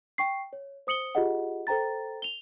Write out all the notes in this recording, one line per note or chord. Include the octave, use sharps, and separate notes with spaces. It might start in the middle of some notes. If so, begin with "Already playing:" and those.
G5 C#6 C7
C#5
C5 D#6 C#7 F#7 G7
F4 G4 G#4 D#5 F#5
A4 C5 G5 A#5 A6
F7 G7